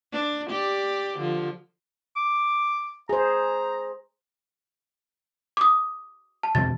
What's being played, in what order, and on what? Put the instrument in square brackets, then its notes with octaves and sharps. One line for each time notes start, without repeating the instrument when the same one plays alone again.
[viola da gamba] D4
G4 D5
D3 F3
[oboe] D6
[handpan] G#4 C5 [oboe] A#5
[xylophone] D6 D#6
A5
[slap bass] B2 E3 C4 [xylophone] A6